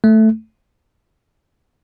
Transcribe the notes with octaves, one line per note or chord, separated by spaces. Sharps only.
A3